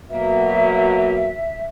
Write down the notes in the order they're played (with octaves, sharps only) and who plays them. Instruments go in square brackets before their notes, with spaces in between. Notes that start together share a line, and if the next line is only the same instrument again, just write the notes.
[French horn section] B2 F#3 A#3 [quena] E5